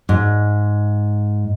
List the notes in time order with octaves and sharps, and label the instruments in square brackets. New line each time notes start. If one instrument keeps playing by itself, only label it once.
[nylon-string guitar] G#2